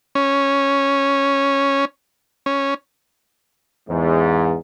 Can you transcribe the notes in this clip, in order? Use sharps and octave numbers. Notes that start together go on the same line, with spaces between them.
C#4
C#4
E2 G#2